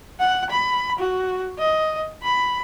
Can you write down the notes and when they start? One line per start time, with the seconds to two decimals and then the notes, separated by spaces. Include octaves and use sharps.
0.20 F#5
0.51 B5
0.99 F#4
1.59 D#5
2.23 B5